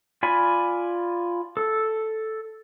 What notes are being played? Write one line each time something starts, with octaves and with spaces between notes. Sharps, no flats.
F4 D5 G#5 B5
A4